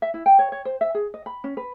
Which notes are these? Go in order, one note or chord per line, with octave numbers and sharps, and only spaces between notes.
E5
E4
G5
C#5
C#5
C5
E5
G#4
D#5
B5
C#4
B4